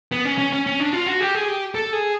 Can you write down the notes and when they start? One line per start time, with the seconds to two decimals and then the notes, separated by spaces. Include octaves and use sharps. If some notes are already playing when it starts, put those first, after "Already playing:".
0.12 B3
0.25 C#4
0.38 C#4
0.53 C#4
0.67 C#4
0.80 D4
0.93 F4
1.06 F#4
1.20 G4
1.35 G#4
1.48 G4
1.75 A4
1.93 G#4